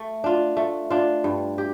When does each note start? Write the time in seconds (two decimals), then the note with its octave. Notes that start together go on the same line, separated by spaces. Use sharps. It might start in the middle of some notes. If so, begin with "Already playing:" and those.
Already playing: A3
0.24 D4 F4
0.57 A3
0.90 D4 F4
1.24 G2
1.58 G4